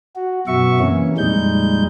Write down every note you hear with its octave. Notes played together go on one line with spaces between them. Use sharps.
F#4
F#2 B2 F#4 E5 C#6
C3 E3 A#3 C#4
F2 A#2 G3 G#3 D#4 G6